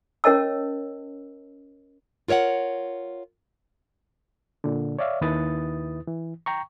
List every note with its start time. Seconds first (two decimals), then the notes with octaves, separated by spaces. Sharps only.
0.24 C#4 A#4 C#5 D#5 A5 E6
2.28 F4 A#4 C#5 E5 F#5
4.64 A#2 D3
4.99 C#5 D5 E5 F5
5.21 D#2 D#3 E4 B4 D#6 A6
6.07 E3
6.46 G5 A#5 C#6